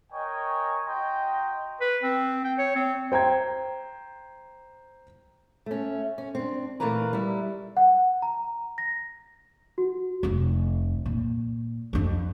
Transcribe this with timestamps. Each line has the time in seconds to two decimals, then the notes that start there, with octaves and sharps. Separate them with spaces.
0.12 A#4 C#5 D#5 G5 G#5 C#6
0.86 F#4 D#5 G5 A#5 C6
1.81 B4
2.03 C4
2.45 G5
2.58 C#5
2.76 C4
3.12 C5 G5 A#5 G#6
5.66 A3 C#4
6.18 C#4
6.35 C4 D4
6.80 A#2 E3 A3 A#3 B4 A#5
7.13 G3 E4
7.77 F#5
8.22 A#5
8.78 A#6
9.78 F#4
10.23 F1 F2
11.06 A#2
11.93 F2 D4